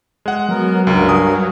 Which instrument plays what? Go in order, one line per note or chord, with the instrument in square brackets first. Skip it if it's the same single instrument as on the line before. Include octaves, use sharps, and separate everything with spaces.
[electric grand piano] G#3 F#5
[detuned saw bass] F#3 [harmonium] B3 A#4
[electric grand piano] C#2 [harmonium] G2 A#4
[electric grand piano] G#5 D#6